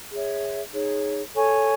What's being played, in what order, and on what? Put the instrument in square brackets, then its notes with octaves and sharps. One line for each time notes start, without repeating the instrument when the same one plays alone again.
[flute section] G#4 C#5 E5
D#4 G#4 C#5
A4 C#5 G#5 C#6